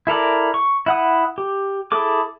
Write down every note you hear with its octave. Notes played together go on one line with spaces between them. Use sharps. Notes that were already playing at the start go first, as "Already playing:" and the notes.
E4 A4 A#4 D5
C#6
E4 F#5 D#6
G4
E4 G#4 A4 D6